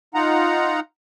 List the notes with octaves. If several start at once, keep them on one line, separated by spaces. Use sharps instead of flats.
D#4 F4 F#5 A#5